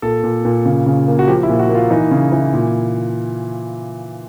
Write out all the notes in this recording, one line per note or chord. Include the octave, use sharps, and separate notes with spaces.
A#2 A4
A#2
A#2
C#3
C#3
A#3
F#4
F3 G4
E4
A#2
F#4
A#3
F4
E3 D#4
C#3
E3
A#2